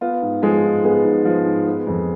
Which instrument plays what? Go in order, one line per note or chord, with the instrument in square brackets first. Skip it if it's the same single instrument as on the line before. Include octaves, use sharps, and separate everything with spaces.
[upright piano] B3 F4
G#2
F3 G#3 G#4
G#2
G#3 B3 G#4
G#2
F3
G#2
B3
F2